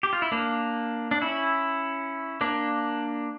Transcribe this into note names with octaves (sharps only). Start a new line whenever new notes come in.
G4
F4
E4
A#3 D4
D4
C#4 E4
A#3 D4